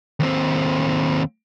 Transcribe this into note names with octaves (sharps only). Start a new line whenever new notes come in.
D#2 C4